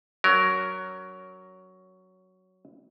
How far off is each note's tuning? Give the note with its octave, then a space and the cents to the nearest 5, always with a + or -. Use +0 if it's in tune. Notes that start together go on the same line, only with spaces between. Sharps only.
F#3 +10 C#4 +20 A#4 +0